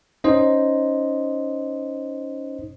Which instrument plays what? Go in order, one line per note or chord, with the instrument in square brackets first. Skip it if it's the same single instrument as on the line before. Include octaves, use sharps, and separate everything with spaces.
[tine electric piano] C#4 D#4 C5 D#5